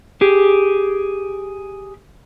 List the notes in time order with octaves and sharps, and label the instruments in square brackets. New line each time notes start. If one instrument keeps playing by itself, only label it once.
[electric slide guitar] G4 G#4